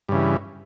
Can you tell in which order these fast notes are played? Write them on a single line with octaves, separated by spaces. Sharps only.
G2 C#3 E3